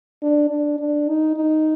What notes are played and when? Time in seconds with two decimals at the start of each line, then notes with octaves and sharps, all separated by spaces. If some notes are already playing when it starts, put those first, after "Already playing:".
0.22 D4
0.50 D4
0.79 D4
1.08 D#4
1.36 D#4